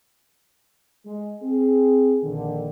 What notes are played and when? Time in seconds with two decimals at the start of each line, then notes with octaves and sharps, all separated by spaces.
1.06 G#3
1.42 C4 G#4
2.22 A#1 D3 D#3